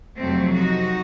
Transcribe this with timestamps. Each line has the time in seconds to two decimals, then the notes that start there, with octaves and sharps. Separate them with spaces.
0.17 F2 C3 F#3 A3 C4
0.55 D#4 F#4